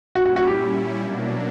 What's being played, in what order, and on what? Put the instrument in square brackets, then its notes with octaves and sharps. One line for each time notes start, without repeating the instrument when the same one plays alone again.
[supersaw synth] A#2 G3 C#4 E4 [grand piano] F#4
[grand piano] F#4
F#4
G4
[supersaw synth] B2 F#3 A#3 D4